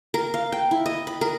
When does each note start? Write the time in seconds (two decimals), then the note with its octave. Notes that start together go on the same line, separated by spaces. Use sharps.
0.14 A#4
0.34 F5
0.52 G5
0.71 E4
0.86 D#5
1.07 B5
1.21 A#4